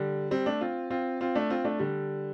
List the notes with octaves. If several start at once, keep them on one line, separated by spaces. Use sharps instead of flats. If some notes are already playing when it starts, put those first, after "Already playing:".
Already playing: D3 G3
G3 C4
A3 D4
C4 F4
C4 F4
C4 F4
A3 D4
C4 F4
A3 D4
D3 G3